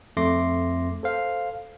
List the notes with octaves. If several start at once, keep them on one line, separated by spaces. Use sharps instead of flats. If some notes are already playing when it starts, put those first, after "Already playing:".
F2 A3 C6 D6 A#6 C7
A4 C5 F5